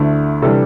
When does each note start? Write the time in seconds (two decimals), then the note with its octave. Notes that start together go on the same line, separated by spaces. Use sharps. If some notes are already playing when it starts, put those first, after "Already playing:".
Already playing: D2 D3 A3 E4
0.42 C3 E3 G3 D4 A4